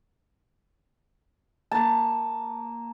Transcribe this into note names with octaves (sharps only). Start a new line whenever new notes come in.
A#3 A5